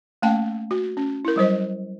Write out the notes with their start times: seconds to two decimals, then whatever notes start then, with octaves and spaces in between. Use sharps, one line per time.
0.22 A3 A#3 C#4 F5 G5 A5
0.71 F#4
0.97 C#4
1.25 E4 A#4
1.36 F#3 G3 C5 D#5